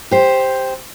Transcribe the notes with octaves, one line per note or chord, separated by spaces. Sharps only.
G4 C5